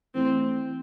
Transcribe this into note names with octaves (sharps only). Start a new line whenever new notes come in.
E3 A3 C4 E4